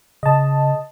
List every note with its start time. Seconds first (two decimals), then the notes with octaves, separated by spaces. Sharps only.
0.23 C#3 D#5 A5